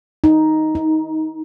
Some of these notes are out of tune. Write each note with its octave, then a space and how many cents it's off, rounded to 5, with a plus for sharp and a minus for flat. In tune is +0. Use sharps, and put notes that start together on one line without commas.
D#4 +5
D#4 +25